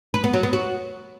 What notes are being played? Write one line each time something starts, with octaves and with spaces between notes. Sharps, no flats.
B4
B3
F#3
B3
F#4